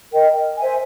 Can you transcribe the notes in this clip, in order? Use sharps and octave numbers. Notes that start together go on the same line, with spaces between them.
A#4 D#5 G5
C5 E5 G#5